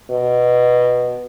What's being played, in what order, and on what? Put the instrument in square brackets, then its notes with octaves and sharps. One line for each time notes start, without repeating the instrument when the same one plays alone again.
[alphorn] B2